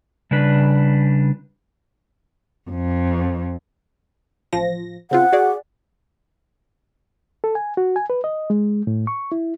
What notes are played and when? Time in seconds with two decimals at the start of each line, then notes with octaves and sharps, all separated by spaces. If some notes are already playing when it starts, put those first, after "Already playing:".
0.31 C#3 G3 D4 B4
2.70 F2
4.53 A1 F3 A#6
5.11 C#3 C4 F4 F#5
5.33 F#4 G#4 D5
7.44 A4
7.55 G#5
7.77 F#4
7.96 G#5
8.10 B4
8.24 D#5
8.50 G#3
8.87 A2
9.07 C#6
9.32 E4